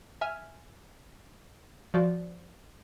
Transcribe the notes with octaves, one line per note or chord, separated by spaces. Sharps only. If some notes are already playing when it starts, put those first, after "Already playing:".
E5 G#5 F6
F3 F#4 C5 D5